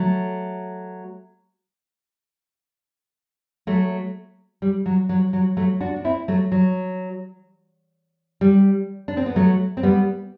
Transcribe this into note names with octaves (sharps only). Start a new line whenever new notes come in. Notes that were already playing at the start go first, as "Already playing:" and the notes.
Already playing: F#3 A3
F#3 A3
G3
F#3
F#3
F#3
F#3 A3
D4 F#4
D4
C4 E4
F#3 A3
F#3
G3
D4
C4
B3
F#3 A3
C4
G3 B3